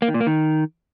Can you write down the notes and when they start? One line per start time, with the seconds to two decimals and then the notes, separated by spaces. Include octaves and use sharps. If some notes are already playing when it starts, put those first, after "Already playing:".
0.02 A#3
0.08 D#3
0.14 A#2
0.21 A#3
0.27 D#3